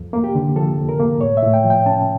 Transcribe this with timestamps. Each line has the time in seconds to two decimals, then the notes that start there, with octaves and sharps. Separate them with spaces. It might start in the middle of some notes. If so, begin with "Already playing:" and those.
Already playing: F2
0.13 A#3
0.24 G4
0.35 D3
0.56 F3 A4
0.78 F2
0.89 A#4
1.00 A#3
1.21 A2 C#5
1.37 E5
1.43 A2
1.54 G5
1.64 F3
1.70 G5
1.86 C#4 A5